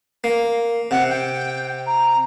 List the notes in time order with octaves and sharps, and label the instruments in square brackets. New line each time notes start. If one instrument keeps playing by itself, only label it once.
[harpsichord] A#3
[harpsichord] C3 [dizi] F#5
[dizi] G5
A#5